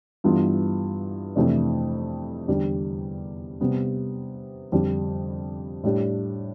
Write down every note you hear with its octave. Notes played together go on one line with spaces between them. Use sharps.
G2 E3 G3 B3 F4
F2 C3 E3 A3 D4
E2 D3 G3 D4 G4
C3 G3 B3
F2 D3 G3 D4
A2 G3 D4 G4